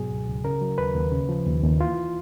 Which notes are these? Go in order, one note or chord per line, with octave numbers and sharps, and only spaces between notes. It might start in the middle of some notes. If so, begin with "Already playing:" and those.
Already playing: G#2 B2 F#3 G#4
C#2
C#2
C#3 A#4
F#3
D#2 B4
D#2
C#3
F3
D#2
D#2
E3 F4